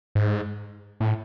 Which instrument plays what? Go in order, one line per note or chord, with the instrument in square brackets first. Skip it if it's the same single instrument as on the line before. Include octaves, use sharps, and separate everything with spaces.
[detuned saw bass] G#2
A2